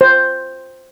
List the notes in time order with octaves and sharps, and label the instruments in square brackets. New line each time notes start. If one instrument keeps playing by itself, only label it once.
[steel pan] C5